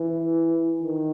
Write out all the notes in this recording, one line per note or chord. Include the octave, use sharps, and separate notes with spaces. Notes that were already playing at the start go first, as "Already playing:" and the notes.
Already playing: E3
D#3